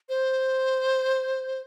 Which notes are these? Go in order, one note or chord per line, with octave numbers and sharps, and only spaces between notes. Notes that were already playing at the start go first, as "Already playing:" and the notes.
C5